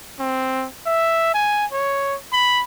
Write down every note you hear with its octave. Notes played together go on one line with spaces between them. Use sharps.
C4
E5
G#5
C#5
B5